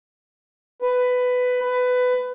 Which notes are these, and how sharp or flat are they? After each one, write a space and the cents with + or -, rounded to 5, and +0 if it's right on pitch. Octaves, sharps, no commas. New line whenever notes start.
B4 +15
B4 +20